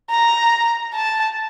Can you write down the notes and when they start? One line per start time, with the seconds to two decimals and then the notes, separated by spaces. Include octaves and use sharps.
0.10 A#5
0.94 A5